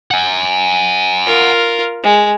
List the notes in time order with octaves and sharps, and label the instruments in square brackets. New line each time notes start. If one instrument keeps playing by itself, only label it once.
[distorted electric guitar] F#5 G#5
[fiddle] F4 A#4
G#3